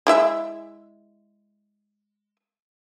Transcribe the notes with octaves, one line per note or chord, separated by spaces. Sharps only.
G#3 E4 E5